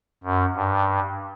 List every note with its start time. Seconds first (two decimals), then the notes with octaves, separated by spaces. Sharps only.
0.24 F#2
0.55 G2